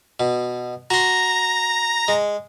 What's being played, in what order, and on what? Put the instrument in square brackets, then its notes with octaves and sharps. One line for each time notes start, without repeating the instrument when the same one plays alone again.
[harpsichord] B2
[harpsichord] F#4 C6 [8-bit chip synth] A#5 A#6
[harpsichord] G#3